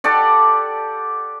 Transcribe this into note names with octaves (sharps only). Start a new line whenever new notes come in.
G4 A4 D5 F#5